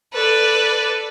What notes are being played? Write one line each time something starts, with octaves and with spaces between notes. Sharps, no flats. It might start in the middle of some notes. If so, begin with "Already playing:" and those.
A4 B4 D5